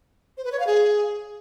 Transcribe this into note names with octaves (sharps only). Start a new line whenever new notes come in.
C5
B4
C#5
F5
G#4